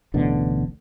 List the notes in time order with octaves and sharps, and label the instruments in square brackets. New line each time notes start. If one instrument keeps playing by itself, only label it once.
[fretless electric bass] D1 A1 B2 D3